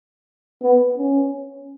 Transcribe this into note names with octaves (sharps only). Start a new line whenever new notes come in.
B3
C#4